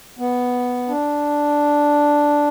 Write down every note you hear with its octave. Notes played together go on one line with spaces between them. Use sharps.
B3
D4